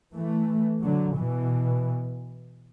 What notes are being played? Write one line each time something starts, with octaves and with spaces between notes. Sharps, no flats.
E3 A3
D3 F#3
B2 E3